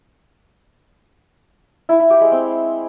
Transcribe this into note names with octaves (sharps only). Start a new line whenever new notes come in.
E4
E4
G4
G#3
C4